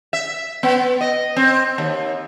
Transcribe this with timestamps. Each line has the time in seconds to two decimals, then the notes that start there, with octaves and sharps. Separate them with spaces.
0.13 E5
0.63 B3
1.01 D#5
1.36 C4
1.78 D#2